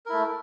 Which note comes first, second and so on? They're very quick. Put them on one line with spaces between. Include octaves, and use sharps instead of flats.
A#4 E4 A3